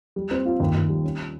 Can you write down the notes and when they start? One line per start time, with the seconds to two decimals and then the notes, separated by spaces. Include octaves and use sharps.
0.16 G3
0.31 C4
0.46 F4
0.60 D#2
0.75 D#2
0.89 G3
1.04 C#4